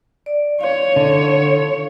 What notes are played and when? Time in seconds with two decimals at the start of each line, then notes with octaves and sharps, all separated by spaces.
0.26 D5
0.61 C#5 F5
0.96 D3